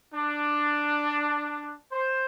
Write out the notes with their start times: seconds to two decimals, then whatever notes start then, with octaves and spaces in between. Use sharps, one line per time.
0.14 D4
1.92 C5